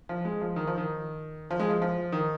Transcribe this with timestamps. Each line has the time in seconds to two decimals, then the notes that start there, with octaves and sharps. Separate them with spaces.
0.09 F3
0.25 G#3
0.41 F3
0.56 D#3
0.67 F3
0.78 D#3
1.51 F3
1.60 G#3
1.69 F3
1.82 F3
2.12 D#3